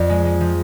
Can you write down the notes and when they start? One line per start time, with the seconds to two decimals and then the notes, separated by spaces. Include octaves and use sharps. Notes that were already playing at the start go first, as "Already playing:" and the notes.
Already playing: F2 F3 D5
0.09 G#3
0.25 G#3
0.41 F3